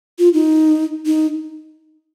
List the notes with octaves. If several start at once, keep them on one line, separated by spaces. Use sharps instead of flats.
F4
D#4
D#4